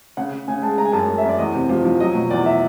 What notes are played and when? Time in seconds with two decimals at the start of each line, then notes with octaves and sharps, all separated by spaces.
0.17 C#3 F#5
0.31 C#3
0.48 C#3 G#5
0.62 G#3 A5
0.77 G#3 A#5
0.85 G#5
0.93 F#2 A5
1.08 F#2
1.18 E5
1.23 F#2
1.29 D5
1.38 E2 D#5
1.54 C3
1.69 F3
1.85 F3
2.00 F#3 D#5
2.15 B2
2.30 E2 D5
2.46 E5